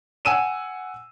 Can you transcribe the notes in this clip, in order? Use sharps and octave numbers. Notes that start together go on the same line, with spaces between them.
F#5 G#5 E6 D#7 E7